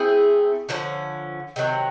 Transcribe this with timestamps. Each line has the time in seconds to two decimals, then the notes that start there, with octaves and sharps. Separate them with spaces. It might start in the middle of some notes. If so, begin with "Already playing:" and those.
Already playing: A3 C4 E4 G#4
0.69 D3 F3 A3 C#4
1.56 C3 D#3 F#3